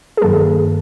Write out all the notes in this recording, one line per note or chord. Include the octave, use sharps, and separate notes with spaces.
G#4
G2 D#3 F#3 A#3 A4